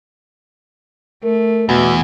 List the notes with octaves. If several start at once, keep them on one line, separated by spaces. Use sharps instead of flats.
A3 A#4
E2 B2